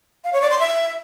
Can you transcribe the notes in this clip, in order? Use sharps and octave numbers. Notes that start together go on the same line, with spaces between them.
F5
C#5
D5
C6
E5